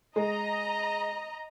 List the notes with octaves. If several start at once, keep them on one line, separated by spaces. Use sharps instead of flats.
G#3 D#5 A#5